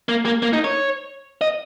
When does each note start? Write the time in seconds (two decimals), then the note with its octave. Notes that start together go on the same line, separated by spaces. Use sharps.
0.09 A#3
0.25 A#3
0.42 A#3
0.53 D#4
0.64 C#5
1.41 D#5